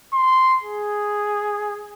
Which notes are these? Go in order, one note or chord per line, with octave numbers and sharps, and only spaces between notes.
C6
G#4